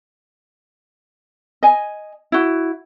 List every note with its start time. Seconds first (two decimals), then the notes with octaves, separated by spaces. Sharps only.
1.63 D#5 G#5
2.32 E4 F#4